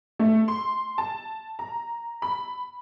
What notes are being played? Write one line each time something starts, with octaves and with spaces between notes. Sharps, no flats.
A3
C6
A5
A#5
B5